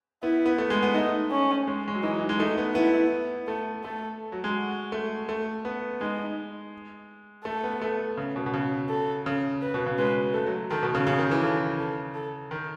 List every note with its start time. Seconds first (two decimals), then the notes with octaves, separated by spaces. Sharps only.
0.23 B3 E4
0.46 B3
0.58 A3
0.70 G#3
0.83 B3
0.94 A3 D#4
1.31 C#4
1.67 G#3
1.88 G#3
1.95 F#3
2.03 E3 D#4
2.19 F#3
2.29 G#3
2.39 A3 D#4
2.58 B3
2.75 B3 E4
3.47 A3 A4
3.84 A3 A4
4.32 F#3
4.44 G#3
4.56 F#4
4.92 A3
5.29 A3
5.65 B3
6.01 G#3 D#4
7.45 A3 A4
7.64 B3
7.81 A3
8.17 C#3
8.36 B2
8.46 B2
8.54 C#3
8.89 A4
9.26 C#3
9.62 B4
9.74 B2
9.86 C#3
9.98 G#3 B4
10.34 A3 A4
10.47 F#3
10.70 D#3 A4
10.83 B2
10.95 C#3
11.07 C#3 G#4
11.18 D#3
11.31 E3
11.42 C#3 A4
11.79 A4
12.15 A4
12.51 D#3